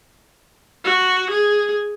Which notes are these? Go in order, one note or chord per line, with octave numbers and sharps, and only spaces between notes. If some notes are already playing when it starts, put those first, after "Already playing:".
F#4
G#4